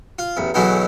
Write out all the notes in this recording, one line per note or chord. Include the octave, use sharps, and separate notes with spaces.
F4
A1 E2
B1 B2 E3 F#3 G#3 A3